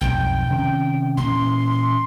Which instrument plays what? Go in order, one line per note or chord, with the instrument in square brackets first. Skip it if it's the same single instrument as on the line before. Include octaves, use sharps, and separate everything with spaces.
[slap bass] B1 F2 G#2 [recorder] G5
[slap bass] C3 D#3 C#4
[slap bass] A#2 E3 C#4 [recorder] C6